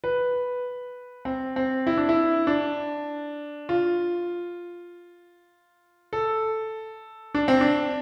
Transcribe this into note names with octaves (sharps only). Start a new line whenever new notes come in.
B4
C4
C4
E4
D4
E4
D4
F4
A4
D4
C4
D4